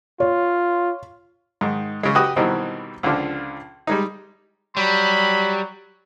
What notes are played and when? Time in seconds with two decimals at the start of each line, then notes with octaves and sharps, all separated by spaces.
0.20 F4 C#5
1.61 G#2 D#3
2.03 C#3 G#3
2.15 F#4 G4 B4 D#5 D#6
2.36 B2 D#3 E3 F#3 G3 C4
3.03 C#2 D3 F3 D4 F4
3.87 G3 G#3 D#4
4.77 F#3 G3 B5